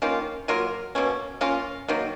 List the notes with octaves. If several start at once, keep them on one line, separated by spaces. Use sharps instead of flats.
D#3 A#3 C#4 F4
F#3 A#3 F4 A#4
B2 A#3 C#4
A#3 C#4 F4
D#3 F#3 A#3